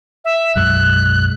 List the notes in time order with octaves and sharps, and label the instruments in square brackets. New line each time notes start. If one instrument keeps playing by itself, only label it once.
[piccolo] E5
[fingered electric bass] B1 F#2 G#3 [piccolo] F#6